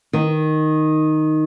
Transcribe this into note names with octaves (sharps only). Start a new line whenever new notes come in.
D#3